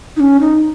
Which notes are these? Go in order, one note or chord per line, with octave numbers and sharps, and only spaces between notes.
D#4
C#4
D#4